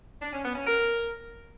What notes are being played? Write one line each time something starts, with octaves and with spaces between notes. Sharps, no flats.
D4
C#4
B3
C#4
A#4